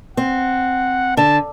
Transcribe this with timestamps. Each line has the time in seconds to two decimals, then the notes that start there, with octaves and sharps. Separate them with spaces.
0.17 C4 F#5
1.17 D3 A5